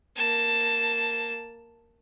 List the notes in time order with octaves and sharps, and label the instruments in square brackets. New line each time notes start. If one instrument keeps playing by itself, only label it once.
[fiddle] A#3 A5